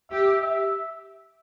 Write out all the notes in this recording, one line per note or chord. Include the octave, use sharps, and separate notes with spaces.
G4 E5
E5